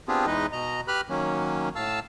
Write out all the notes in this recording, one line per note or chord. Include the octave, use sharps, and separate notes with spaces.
B3 C4 D4 F4 G4 G#4
E2 E3 G#3 D#4 B4 D#5
B2 D#5 A#5
G4 B4 B5 F6 F#6
D#3 F#3 A#3 C#4
A2 F5 A5 E6